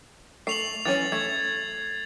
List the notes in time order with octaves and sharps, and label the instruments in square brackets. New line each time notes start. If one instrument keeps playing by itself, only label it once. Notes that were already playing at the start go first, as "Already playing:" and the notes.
[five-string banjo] A3 [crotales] C7 F7 F#7
[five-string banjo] E3 F#3 C#4 [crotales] A6
[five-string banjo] A3 [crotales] G#6